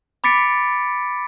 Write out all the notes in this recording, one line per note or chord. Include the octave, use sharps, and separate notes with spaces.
B5 D6 A6 B6 C#7 D7